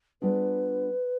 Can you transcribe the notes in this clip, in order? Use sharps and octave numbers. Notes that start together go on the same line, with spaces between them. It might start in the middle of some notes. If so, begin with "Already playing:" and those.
G3 B3 D4 F4 G#4 B4